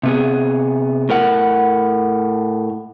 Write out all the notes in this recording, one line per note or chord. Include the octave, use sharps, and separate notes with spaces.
C3 B3 G#4
A2 A#4 F#5